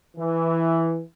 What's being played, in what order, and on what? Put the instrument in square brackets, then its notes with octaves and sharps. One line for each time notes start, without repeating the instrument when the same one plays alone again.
[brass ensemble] E3